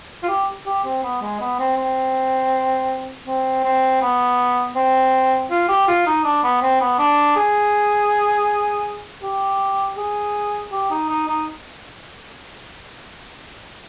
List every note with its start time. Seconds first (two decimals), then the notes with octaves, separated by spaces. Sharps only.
0.23 F4
0.28 G4
0.66 G4
0.84 C4
1.03 B3
1.21 G#3
1.40 B3
1.59 C4
1.77 C4
3.27 C4
3.64 C4
4.02 B3
4.76 C4
5.51 F4
5.69 G4
5.88 F4
6.06 D#4
6.24 D4
6.43 B3
6.62 C4
6.80 B3
6.99 D4
7.36 G#4
9.23 G4
9.97 G#4
10.72 G4
10.91 D#4
11.09 D#4
11.28 D#4